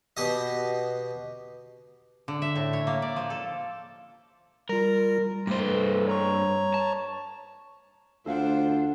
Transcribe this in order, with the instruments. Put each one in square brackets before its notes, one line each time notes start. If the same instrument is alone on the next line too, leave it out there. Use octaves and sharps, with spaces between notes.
[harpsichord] B2 G4 D#5
[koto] D3
E5
A2
C#5
A#3
D5
F3
A4
[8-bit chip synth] G3 F4 [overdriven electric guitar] A#4
[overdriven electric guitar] G2 C5 [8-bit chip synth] A3
[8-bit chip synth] A4 B4
C#5 A#5 C#6
[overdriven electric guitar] A5
[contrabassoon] D2 [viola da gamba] D4 C5 [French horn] F4 [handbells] A4 F5 F#5